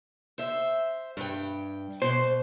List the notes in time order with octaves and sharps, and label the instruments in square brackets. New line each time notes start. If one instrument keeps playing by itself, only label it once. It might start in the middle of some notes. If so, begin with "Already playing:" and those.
[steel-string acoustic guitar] C5 E5
G2 G5
[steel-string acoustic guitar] B2 [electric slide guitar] C5